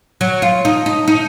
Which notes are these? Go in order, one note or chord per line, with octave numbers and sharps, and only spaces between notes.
F#3
F4
D#4
D#4
D#4